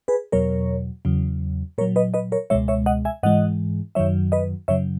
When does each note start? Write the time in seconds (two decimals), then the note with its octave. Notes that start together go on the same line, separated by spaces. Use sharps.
0.08 G#4 B4
0.32 E2 B2 F#3 A#4 C#5
1.05 E2 C#3 F#3
1.78 A#2 A#4 C#5
1.81 F#3
1.96 B4 D#5
2.14 B4 D#5
2.32 A#4 C#5
2.50 C#2 B2 G#3 C#5 E5
2.68 C#5 E5
2.86 D#5 F#5
3.05 E5 G#5
3.23 G#2 E3 G#3 D#5 F#5
3.95 F#2 D#3 F#3 C#5 E5
4.32 B4 D#5
4.68 F#2 C#3 F#3 C#5 E5